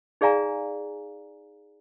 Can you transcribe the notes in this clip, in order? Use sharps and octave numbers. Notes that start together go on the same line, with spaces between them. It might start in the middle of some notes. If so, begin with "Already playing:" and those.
D#4 G#4 D5 F5 G#5 A#5